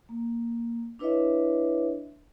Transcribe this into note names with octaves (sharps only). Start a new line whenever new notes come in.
A#3
D4 E4 B4 C#5 D#5 E5